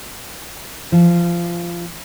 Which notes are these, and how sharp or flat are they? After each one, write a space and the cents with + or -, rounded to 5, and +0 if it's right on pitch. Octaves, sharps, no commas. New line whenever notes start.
F3 -20